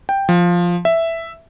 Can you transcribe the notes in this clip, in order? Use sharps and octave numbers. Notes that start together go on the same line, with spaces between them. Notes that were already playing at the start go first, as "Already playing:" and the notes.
G5
F3
E5